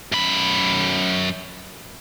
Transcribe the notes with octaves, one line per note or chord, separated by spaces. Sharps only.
F#2 B5